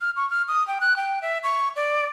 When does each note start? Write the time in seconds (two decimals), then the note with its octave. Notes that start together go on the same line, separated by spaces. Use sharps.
0.01 F6
0.16 C#6
0.30 F6
0.48 D#6
0.67 G5
0.81 F#6
0.97 G5
1.22 E5
1.43 C#6
1.76 D5